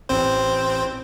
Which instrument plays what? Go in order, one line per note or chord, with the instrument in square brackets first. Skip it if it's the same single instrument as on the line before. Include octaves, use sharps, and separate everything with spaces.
[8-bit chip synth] A1 C4 C5